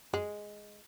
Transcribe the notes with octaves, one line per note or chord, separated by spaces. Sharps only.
F#2 G#3